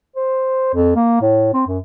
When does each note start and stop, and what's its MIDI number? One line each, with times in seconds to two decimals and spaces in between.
0.16 0.73 72
0.74 0.93 41
0.95 1.18 58
1.21 1.51 45
1.54 1.63 60
1.67 1.79 42